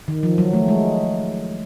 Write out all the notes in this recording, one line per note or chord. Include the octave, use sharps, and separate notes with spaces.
D#3
F3
F#3
A3
G#3